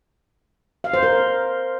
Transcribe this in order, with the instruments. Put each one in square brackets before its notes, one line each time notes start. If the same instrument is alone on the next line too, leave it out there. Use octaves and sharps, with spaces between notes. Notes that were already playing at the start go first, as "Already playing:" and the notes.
[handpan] F5
C5
A#4